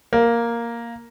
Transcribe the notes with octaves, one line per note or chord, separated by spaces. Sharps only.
A#3